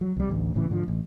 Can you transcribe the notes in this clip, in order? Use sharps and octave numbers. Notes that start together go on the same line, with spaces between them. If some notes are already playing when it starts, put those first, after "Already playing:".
F#3
C2 G3
A1 D2
E1 A2 C#3 E3
G#2 D3 F3
A1